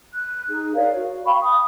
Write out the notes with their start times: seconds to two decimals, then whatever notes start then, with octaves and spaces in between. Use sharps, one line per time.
0.15 F#6
0.49 D#4 G#4
0.75 A#4 C#5 D5 F5
0.94 F#4
1.25 F5 G5 B5 C#6
1.42 D#6